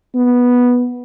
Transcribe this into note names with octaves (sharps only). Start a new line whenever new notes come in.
B3